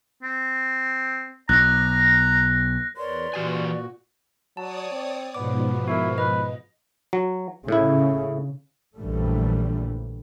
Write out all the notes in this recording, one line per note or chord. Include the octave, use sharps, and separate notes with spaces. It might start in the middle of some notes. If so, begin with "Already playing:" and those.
C4
B1 A#5 F#6 A#6
E2 A#4 B4 C#5 D5 C6
A#2 E3 F#4 G4 G#5
F#3 C#5 D5 A5 D#6
C4
G#2 B2 F3 B3 D6
E4 F#4 A#4
B4 D#5
F#3
A2 C#3 E4
A#1 F#2 D3 E3 G3 A3